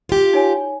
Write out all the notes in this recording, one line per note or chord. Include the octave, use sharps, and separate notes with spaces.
F4 G4
D#4 C#5 G#5